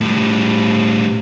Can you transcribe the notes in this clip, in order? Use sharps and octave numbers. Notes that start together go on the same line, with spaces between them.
A2 G3